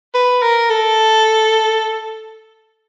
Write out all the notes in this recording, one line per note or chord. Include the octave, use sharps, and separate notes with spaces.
B4
A#4
A4